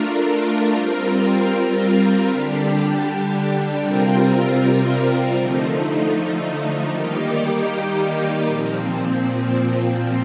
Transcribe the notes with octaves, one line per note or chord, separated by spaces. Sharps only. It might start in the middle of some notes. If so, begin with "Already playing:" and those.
Already playing: A3 D4 F4 A#4
G3 C4 F4 A#4
D3 G3 D4 G4
C3 G3 C4 F4 A#4
D3 F3 A3 D#4
D#3 G3 A#3 D#4 G4
A#2 F3 C4